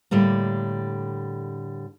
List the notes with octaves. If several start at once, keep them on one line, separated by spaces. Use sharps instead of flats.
A2 D3 G3 A#3